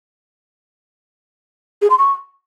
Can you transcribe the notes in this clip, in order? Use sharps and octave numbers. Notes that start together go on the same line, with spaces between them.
G#4
C6
C#6